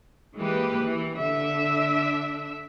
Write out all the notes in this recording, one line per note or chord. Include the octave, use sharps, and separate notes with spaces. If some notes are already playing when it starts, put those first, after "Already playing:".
E3 G#3 A#3 G4 B4
E3
D3 D4 E5